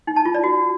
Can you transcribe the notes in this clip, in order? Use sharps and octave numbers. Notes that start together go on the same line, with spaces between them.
D#4
A5
F4
D5
F#4